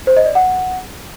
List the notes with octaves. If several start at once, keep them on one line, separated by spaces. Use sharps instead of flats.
C5
D#5
D5
F#5